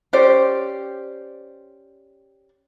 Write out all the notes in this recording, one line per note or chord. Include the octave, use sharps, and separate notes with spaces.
C#4 G4 C5 D5